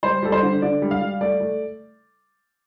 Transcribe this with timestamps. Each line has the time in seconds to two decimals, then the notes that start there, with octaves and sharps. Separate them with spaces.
0.03 G3 C5
0.23 G3 A4
0.32 C5
0.43 D3
0.62 D3 D5
0.82 G3
0.91 F5
1.01 G3
1.21 A3 D5
1.40 A3